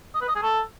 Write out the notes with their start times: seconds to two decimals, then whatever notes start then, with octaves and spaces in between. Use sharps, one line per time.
0.14 D#5
0.21 B4
0.29 D#5
0.36 G#4
0.43 A4